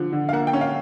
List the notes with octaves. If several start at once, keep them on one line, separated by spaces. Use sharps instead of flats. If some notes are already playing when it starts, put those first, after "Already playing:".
Already playing: D3 F3
D3
F5
A#3 F#5
G5
C#4
F5